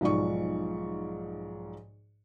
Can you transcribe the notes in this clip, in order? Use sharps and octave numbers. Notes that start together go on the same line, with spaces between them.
B1 G#2 F3 D5 C#6